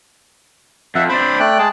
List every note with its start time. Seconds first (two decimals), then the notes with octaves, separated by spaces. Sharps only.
0.95 F2 E5 F#5
1.09 C4 D4 C5 B5
1.40 A3 D5 G5 F#6
1.59 G#3 G#4 A5